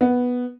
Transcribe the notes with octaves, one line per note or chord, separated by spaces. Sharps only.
B3